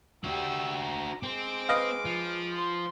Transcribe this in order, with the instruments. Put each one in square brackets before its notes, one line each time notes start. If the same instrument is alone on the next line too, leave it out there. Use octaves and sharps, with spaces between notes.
[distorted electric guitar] D4 F#4 [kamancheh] G4 E6
[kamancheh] A#5
[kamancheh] G#3 D6 [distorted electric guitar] C4
[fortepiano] B4 D#5 F5
[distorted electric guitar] F3
[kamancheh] C6